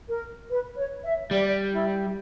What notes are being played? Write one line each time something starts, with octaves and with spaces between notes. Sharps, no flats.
A#4
B4
C#5
E5
G3 D5
E4